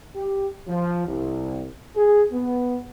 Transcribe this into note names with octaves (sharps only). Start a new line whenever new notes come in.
G4
F3
C2
G#4
B3